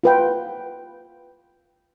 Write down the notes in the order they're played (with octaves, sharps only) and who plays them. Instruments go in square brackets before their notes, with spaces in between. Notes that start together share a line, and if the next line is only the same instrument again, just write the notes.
[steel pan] F4 B4 G5